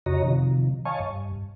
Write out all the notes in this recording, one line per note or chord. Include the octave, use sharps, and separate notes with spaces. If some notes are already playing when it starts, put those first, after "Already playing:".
F2 C#3 F#4 C#5 D#5 A#5
C3 D#3 F3
C#5 D#5 F5 G#5 A5 C#6
G2